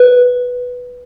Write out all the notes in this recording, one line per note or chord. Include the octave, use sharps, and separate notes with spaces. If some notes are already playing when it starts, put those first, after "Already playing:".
Already playing: B4